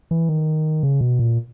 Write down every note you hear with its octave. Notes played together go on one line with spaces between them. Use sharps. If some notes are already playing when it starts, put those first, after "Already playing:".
E3
D#3
C#3
B2
A#2